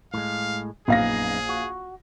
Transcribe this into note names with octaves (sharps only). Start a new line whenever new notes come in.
A2 G#3 F5
A#1 F#2 B3 D#4 G#4 F5 A#6
F#4